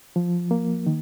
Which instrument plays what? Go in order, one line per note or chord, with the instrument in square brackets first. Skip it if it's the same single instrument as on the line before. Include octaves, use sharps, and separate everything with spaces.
[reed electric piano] F3
A#3
D#3